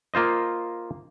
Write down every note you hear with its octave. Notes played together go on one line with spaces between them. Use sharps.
A#3 F4 C5 D#5